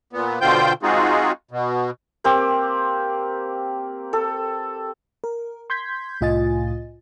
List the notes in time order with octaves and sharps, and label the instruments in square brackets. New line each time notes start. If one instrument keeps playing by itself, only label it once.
[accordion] A#2 B3
B2 D3 F4 C5 G5 G6
G#3 C4 D#4 F4 F#4 G#4
B2
[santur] A#3 C4 G4
A4
[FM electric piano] A#4
C6 G6 G#6 B6
C2 A2 F4 D#5 G#5 A6